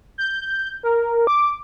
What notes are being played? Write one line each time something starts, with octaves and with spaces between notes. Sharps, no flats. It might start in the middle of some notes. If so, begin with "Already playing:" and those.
G6
A#4
D6